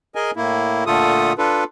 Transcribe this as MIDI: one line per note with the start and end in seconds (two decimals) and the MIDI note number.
0.15 0.31 68
0.15 0.31 70
0.15 0.31 75
0.15 0.31 80
0.36 0.84 45
0.36 0.84 58
0.36 0.84 64
0.86 1.33 46
0.86 1.33 50
0.86 1.33 57
0.86 1.33 65
0.86 1.33 69
0.86 1.33 87
1.38 1.64 62
1.38 1.64 65
1.38 1.64 69
1.38 1.64 71